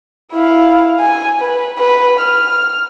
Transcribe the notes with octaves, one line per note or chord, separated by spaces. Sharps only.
E4 F5
G#5
B4
B4
F6